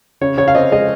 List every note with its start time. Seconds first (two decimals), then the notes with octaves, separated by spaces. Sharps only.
0.21 C#3 C#5
0.38 C#3 C#5
0.48 F5
0.55 C4 D#5
0.72 G#3 D#5